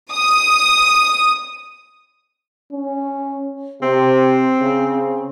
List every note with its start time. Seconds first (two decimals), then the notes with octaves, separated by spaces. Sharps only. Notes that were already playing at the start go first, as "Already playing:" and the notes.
0.13 D#6
2.72 C#4
3.82 C3 C4
4.61 C#3